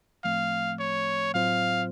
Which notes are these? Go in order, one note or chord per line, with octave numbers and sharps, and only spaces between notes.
A2 F3 A3 C4 F5
C#5
A2 F#3 C4 F4 C5 F5